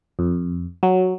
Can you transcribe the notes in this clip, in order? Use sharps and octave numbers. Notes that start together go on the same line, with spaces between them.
F2
F#3